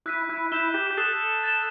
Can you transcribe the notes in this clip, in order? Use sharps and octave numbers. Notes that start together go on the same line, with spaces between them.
E4 F#6 B6 D#7
E4
E4 G6 B6 E7 G7
G4
G4
A4 D#6 F#6 C7 E7 G7
A6 E7 G7